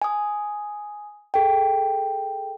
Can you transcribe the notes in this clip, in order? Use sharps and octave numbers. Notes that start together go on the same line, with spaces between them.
G#5 D#6
G#4 A4 G5